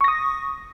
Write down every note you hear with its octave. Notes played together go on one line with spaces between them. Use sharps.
C#6 D#6 A#6